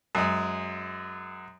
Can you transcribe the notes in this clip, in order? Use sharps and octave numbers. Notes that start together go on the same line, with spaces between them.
F#2 G#3